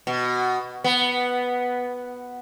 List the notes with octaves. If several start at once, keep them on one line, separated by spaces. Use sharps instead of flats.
B2
B3